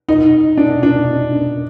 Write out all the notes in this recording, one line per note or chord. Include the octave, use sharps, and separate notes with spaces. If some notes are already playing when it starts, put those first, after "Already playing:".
D#4
D4
D4